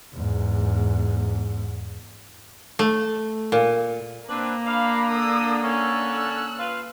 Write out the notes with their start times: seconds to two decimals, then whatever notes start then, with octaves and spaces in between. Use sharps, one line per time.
0.14 E2 G#2
2.79 A3
3.52 A#2
4.29 A#3 C4 D4 B4
4.66 D4 F5 B5
5.10 D3 A4 D#6 E6
5.63 C#4 E6 F#6
6.59 F4 B4 F5